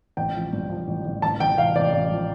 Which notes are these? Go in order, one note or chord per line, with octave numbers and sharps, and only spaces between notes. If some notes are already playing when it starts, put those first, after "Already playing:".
A1 G5
F3
G2
F3
A1
A1
A1 A5
A1 G5
A1 F5
A1 D5
A1
F3